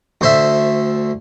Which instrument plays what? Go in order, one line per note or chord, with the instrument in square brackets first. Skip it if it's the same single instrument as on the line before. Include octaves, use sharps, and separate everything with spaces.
[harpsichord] D2 C5 E5